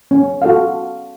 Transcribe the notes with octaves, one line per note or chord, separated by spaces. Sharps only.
C#4
F#4 A4 F5